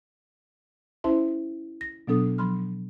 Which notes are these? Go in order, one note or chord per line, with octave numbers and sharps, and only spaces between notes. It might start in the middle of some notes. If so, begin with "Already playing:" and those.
C#4 E4 C5 E5 A5 C6
A#6
B2 F#3 B3 D4 A4 D#6
F3 F#3 B5 C6 F6